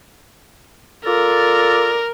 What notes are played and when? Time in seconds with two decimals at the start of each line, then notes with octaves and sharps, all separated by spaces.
1.05 F4 A4 A#4 D5